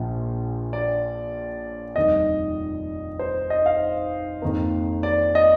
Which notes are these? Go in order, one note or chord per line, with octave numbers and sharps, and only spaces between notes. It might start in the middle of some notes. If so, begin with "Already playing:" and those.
Already playing: A#1 A#2 F3
D5
F1 D#2 D#3 G3 D#5
C5
D#5
F5
F2 D#3 A#3
D5
D#5